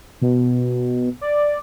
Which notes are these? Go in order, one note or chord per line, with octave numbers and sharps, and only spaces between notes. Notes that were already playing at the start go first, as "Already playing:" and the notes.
B2
D5